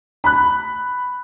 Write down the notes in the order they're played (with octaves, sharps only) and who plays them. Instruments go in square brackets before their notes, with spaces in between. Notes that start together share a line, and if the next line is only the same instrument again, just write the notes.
[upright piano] B5 F#6